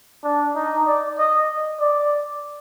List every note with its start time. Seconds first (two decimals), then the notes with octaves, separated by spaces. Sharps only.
0.24 D4
0.55 D#4
0.87 D5
1.18 D#5
1.81 D5